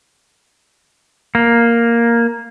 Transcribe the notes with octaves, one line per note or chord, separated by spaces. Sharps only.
A#3